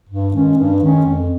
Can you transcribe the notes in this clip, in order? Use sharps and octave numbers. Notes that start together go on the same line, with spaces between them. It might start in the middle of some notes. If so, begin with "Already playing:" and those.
G2
D#3 G#3 C#4
G2
D#3 G#3 C#4
F2